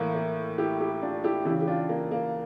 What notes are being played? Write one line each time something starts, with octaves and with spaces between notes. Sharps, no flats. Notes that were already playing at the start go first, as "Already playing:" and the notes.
Already playing: A2 E3 A#3
A#3
E4 G4
E4 G4
D4 F4
E4 G4
C#3 E3 E4 G4
G4
D4 F4
A#3
A#3